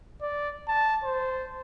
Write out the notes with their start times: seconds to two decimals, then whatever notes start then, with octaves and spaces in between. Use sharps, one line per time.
0.22 D5
0.68 A5
1.04 C5